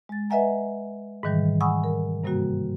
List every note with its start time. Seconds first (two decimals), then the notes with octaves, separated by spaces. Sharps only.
0.09 G#3 A6
0.30 B4 D#5 E5 F#5 G#5 A#5
1.23 G#2 B2 D#3 E3 G3
1.61 F#5 G#5 B5 C#6 D#6 E6
1.84 A#4
2.24 G2 C3 G3 A#3 F#4